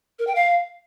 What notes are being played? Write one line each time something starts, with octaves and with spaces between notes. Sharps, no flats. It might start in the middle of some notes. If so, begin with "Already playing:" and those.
A#4
G5
F5